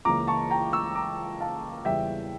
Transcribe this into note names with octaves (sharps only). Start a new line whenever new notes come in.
C#2 C#3 E3 A#3 A#5 D6
A5 C#6
G5 A#5
C#6 E6
A#5 D6
F5 A5
E2 C#3 E3 G3 E5 G5